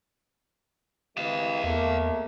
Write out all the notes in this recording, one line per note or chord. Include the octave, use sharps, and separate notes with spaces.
C3 E3 G#3 D#5 F5
E2 A3 A#3